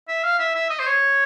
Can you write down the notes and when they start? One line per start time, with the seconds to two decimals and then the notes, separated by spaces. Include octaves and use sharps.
0.08 E5
0.24 F5
0.39 E5
0.55 E5
0.70 D#5
0.79 C5
0.87 C#5